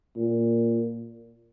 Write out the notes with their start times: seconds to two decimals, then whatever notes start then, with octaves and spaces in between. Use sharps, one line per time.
0.16 A#2